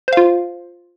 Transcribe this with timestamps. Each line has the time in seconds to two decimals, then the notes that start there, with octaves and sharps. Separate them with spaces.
0.08 C5
0.13 F5
0.17 F4